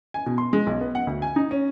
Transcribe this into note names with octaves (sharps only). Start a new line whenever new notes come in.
G#5
B2
C6
G#3
B1
B3
F#5
D2
G#5
D#4
C#4